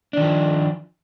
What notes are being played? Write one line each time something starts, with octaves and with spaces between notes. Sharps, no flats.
D#3 F3 D4